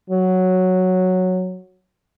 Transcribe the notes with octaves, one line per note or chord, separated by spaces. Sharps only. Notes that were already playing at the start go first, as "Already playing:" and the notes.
F#3